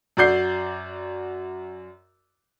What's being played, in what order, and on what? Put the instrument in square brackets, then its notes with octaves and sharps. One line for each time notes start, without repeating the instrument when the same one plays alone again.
[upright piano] F#2 F#4 D5 G6 C7